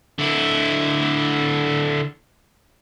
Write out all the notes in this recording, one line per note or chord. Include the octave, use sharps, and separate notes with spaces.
D3 E4